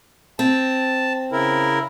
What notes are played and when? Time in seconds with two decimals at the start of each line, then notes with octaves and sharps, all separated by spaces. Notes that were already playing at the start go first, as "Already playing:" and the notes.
0.39 C4 A5
1.32 C#3 E4 A#4